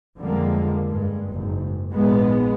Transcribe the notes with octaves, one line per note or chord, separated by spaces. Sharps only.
F2 D3 F3 G3 G#3 A#3
G2 G#3
F#1 G#2
A#1 G#2 G#3 B3